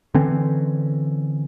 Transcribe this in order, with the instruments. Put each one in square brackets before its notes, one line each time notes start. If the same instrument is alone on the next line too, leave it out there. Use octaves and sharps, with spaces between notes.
[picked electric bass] D3 E3 C4 C#4